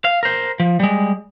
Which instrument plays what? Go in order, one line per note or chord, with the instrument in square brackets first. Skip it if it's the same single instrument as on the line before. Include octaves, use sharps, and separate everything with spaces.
[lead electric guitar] F5
A#4 C5
F3
G3 G#3